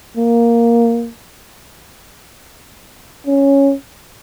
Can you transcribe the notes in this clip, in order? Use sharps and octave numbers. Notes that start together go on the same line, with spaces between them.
A#3
C#4